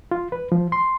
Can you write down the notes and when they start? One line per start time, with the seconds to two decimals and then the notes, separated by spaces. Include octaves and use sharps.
0.11 F4
0.32 B4
0.52 F3
0.72 C6